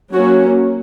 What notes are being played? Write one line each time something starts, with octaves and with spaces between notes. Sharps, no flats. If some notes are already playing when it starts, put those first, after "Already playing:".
F#3 A#3 C#4 F#4